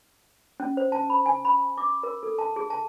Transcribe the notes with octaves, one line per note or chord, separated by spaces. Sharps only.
C#4
C5
A5
B5
G#5
B5
D6
A#4
A4
A5
G#4
A5